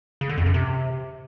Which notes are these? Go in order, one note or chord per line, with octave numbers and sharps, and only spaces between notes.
C#3
D3
F2
F#2
C3